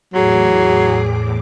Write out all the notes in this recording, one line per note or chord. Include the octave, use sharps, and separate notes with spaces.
E2 A2 F#3 G#4 D6